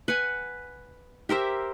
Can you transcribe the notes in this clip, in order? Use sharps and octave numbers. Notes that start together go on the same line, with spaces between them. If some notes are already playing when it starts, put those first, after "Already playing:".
B4 F#5 G#5
G4 A#4 C5 E5